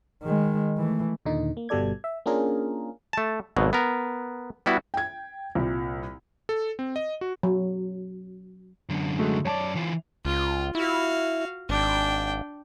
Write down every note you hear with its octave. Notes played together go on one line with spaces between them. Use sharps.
D#3 G#3
E3 A3
D#2 A#2 D3 D#4
A#3
G1 B2 G3 A4 D5 G#6
E5
A#3 C#4 D4 F4 G#4 A#4
A3 A5
G#1 B2 F#3
B3 A#4
G3 B3 E4 F#4
G5 G#6
C2 A#2
A4
C4
D#5
F#4
F#3
F#2 D3
G#3 A3 F#4
F#2 C#5 D5 A5 D6
E3 F4
C#2 F4
E4 F#4 F5
G#1 D4 G5